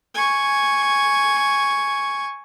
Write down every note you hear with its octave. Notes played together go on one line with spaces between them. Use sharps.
G#5 C#6